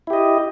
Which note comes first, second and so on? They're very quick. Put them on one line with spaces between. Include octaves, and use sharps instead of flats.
E4 G4 D#5